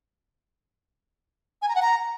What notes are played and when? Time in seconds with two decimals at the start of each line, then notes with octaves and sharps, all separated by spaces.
1.62 G#5
1.69 A#5
1.75 F#5
1.82 A#5